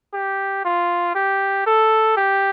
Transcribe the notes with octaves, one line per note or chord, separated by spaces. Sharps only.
G4
F4
G4
A4
G4